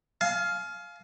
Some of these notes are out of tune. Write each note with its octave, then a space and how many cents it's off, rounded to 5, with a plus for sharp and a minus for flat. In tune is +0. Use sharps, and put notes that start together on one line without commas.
F5 +0 G#5 +40